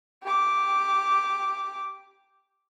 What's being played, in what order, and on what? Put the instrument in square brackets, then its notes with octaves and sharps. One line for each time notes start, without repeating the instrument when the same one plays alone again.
[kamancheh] G4 D6